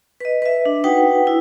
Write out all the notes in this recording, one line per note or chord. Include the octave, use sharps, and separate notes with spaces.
B4 D#5
B4 E5
D4
D#4 F#4 B4 F#5 G5
E4